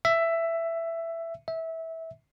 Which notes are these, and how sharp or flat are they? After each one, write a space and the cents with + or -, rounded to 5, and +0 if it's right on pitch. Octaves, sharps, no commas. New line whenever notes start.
E5 +10
E5 -20